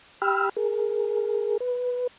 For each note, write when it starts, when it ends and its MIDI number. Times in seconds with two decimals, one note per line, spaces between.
0.22 0.49 67
0.22 0.49 79
0.22 0.49 83
0.22 0.49 88
0.22 0.49 89
0.57 1.58 68
0.57 1.58 70
1.60 2.07 71